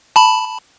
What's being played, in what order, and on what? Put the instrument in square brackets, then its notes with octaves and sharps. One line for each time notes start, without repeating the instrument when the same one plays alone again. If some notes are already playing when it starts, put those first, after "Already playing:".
[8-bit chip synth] A5 B5